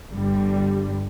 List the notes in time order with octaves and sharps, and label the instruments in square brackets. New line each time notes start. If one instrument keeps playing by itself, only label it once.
[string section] G1 G2 D3 G3